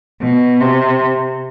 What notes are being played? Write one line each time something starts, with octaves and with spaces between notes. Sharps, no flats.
B2
C3